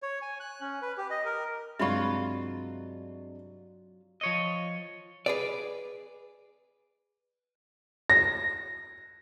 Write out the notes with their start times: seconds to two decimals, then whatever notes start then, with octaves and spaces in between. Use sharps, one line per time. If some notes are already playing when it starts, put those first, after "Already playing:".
0.03 C#5
0.22 G#5
0.40 F#6
0.61 C#4
0.82 B4
0.98 G4
1.10 D#5
1.25 A#4
1.79 G2 C3 F#3 G#3 F4 E5 B5 C#6
4.21 F3 C#5 D#5
5.26 G#4 B4 D5
8.10 A#6